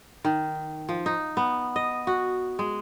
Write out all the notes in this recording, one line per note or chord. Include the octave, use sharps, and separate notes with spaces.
D#3
F3
D#4
B3
D#5
F#4
G#3